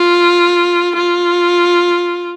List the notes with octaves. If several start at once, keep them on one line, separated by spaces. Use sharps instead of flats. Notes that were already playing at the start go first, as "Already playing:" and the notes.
Already playing: F4
F4